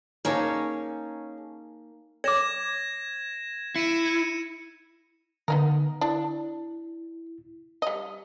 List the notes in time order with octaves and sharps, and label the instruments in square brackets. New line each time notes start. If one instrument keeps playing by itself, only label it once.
[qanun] A#3 D#4 C#5 [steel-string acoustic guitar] C#4 G#4 A5
[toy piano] C#5 D6 [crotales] G#6 A#6 E7
[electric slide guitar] E4 [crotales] C#7 D#7 E7
[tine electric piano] D3 [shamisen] B3 D#4 A#4
[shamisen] D4 [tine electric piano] E4
[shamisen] G3 D#5